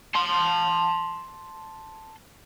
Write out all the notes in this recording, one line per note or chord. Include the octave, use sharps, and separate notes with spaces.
A5 C6